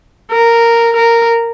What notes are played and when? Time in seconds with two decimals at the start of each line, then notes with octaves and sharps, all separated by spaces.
0.31 A#4
0.96 A#4